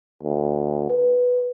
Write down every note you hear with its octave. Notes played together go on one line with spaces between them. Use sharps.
D2
B4